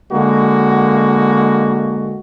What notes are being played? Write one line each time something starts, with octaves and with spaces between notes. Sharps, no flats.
D3 G#3 A#3 F#4